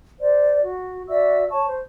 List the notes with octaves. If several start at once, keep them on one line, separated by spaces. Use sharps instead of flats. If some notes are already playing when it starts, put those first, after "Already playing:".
C5 D5
F#4
F#4 D5 E5 E6
C#5 A5 C#6
C5